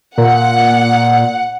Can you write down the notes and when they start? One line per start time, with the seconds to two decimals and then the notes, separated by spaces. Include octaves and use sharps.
0.18 A#2 F#5